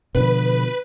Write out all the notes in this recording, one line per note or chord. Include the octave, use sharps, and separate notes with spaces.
B2 D3 F3 B4